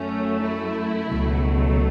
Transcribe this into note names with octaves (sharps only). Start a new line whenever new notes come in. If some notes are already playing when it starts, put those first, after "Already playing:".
Already playing: F#2 F#3 A3 C#4
E4
C#2 B2 F#3 A3